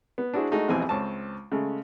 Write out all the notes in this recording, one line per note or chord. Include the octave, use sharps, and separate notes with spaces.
B3
D4 E4 F#4 G#4 C5
G#3 A3 D#4 F#4 G#4
A1 F2 B2 E3 C4 G#5
C#2 C4 C#5 A5
C#3 G#3 A3